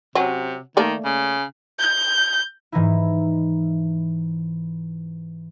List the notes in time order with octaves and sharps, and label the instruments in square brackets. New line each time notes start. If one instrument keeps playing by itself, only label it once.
[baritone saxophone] C3 [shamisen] F#3 C#4
[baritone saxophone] D#3 [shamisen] A3 A#3 D5
[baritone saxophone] C#3
[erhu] G6
[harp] G#2 E3 D#4 E4